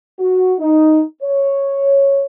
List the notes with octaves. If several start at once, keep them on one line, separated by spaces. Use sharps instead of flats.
F#4
D#4
C#5